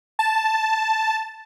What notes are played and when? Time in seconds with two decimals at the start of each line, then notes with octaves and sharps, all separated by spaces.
0.19 A5